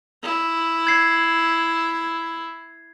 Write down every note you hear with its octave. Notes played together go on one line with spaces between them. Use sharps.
E4
G#6 C7